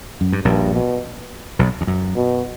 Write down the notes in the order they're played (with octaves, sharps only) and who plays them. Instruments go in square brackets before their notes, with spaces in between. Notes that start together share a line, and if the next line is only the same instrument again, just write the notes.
[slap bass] F#2
G2
[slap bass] A#1 A#2 [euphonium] G2
[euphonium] B2
[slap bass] B1 B2
E2
F#2
[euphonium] B2